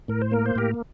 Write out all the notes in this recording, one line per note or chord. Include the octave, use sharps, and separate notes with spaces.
A2 A#4
C5
A#3 A#4
C5
A2 G4 A#4